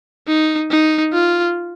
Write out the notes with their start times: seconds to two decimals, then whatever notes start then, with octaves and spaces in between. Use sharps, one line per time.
0.28 D#4
0.71 D#4
1.13 F4